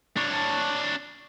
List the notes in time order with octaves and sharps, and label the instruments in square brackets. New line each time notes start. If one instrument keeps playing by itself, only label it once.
[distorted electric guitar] D4 C#5